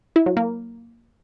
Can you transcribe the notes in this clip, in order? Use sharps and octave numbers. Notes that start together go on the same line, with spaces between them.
E4
F#3
A#3